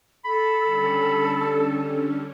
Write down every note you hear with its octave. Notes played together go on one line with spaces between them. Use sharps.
A4 B5
D3 G3 C#4